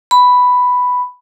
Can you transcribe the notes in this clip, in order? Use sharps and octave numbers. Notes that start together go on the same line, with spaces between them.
B5